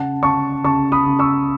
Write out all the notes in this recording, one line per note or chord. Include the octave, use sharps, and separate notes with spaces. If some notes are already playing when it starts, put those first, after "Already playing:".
Already playing: C#3 F#5 A5
C#3 A5 C#6
C#3 A5 C#6
B5 D#6
C#3
C#6 E6